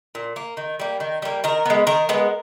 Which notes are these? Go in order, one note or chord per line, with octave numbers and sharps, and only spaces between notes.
A#2
A#3
D#3
G3 A#3
D#3
G3 A#3
D#3 A#4
G#3 B3
D#3 A#4
G#3 B3